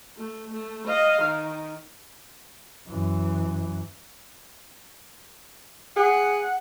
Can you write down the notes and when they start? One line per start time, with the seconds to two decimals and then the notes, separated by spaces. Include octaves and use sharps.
0.17 A3
0.53 A3
0.88 D#5 F5
1.22 D#3
2.88 F#2 E3
5.96 G#4 F#5